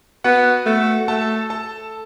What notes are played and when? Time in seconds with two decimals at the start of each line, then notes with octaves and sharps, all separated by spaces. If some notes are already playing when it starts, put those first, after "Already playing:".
0.24 B3 F#4 F#5
0.66 A3
1.08 A3 A4 A5
1.50 A4 A5